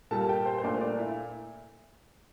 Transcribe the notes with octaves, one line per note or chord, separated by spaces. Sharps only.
A#2 G3 A#3 A4 A5
A5
G4 G5
C5
C5
A#2 A3 D4 D5
D4 D5
E4 E5